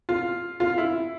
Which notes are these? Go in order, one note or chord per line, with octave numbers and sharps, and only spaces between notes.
F4
F4
E4